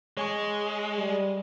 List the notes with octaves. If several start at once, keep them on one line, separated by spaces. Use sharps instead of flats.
G#3 C#5 G#5 C#6
G3